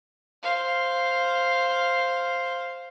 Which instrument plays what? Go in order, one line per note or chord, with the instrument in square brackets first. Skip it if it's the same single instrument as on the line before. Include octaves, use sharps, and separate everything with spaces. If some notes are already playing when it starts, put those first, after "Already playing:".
[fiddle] C5 F5